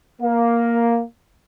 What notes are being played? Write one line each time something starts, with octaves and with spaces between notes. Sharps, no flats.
A#3